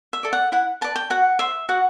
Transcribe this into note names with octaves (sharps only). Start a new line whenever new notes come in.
E5
A4 D5
F#5
E4 F#5
B4 D5 A5
G5
F#4 F#5
C5 E5
F#4 F#5